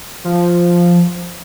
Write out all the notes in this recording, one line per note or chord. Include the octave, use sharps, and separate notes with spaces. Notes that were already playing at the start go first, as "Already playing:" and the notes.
F3